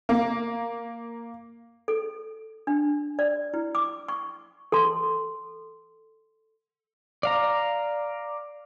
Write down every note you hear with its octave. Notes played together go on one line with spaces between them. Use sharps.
A#3
A4
D4
D5
E4
D6
C#6
A4 C6
D5 F5 A#5